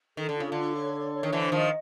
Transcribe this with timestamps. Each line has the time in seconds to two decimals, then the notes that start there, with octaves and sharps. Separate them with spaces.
0.17 D#3 A4
0.29 D3
0.36 C#3 F4
0.52 D3 A4
0.75 C#5
0.94 A4
1.13 C#5
1.23 D#3
1.32 D3 E3 C5
1.52 D#3 F3 D#5